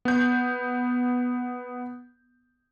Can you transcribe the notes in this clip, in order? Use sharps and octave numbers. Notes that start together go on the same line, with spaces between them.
B3 G6